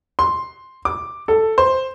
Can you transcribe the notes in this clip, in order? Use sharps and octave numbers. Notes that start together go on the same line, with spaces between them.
C6
D6
A4
C5